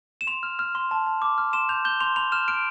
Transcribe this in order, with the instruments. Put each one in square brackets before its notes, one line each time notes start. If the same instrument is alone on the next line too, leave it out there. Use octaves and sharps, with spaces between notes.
[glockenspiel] E7
C6 F7
F6
F6
C6
A5
A5
D6
F6
C6 E7
G6 F7
G6 G7
C6 F7
B5 F7
F6 E7
F6 D7